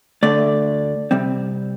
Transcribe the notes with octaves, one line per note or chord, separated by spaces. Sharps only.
D2 D3 A3 D5
C3 G3 C4